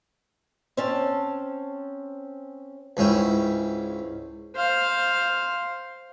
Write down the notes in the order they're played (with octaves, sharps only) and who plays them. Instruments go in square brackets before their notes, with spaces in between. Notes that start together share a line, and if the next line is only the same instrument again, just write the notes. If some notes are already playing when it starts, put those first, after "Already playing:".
[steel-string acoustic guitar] C4 C#4 A5
[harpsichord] C#2 G#2 C#4 E4 G5
[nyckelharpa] C5 F5